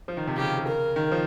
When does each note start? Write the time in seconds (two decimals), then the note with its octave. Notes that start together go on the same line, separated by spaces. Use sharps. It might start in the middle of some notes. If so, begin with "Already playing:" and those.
0.08 F3
0.17 D#3
0.27 C3
0.37 C#3 G4
0.67 A#4
0.96 D#3
1.11 F3